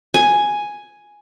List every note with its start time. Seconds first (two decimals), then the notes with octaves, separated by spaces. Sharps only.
0.14 G#5